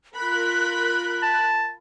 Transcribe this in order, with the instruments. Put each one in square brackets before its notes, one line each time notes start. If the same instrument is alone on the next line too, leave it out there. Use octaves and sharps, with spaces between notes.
[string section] F4 A#4 B5 [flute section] F#6
[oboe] A5